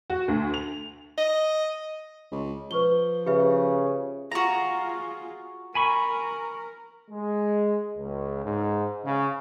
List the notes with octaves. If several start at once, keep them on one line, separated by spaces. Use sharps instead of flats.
F#4
D2
F7
D#5
C#2
F3 B4 C#6 G7
C#3 G4 B4 E5
F4 F#4 G#4 A#5
A#4 G#5 B5 C#6
G#3
C#2
G#2
C#3